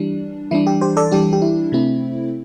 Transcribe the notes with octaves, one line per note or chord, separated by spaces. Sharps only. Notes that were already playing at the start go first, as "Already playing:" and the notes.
Already playing: E3 G3 D4
E3 G3 D4 E4
G4
G4 C5
A4 D5
E3 G3 D4 G4
G4
E4
C3 A3 C4 E4